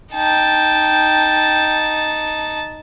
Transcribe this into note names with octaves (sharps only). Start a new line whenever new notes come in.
D#4 G5 A5